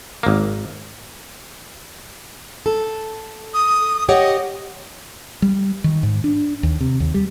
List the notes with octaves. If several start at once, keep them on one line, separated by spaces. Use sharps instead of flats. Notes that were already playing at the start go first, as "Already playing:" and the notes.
G#1 A#3
A4
D#6
G4 C#5 D#5 F#5
G3
D#3
G#2
D4
D#2
C3
D#2
G3